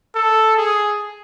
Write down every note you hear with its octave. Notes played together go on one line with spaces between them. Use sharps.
A4
G#4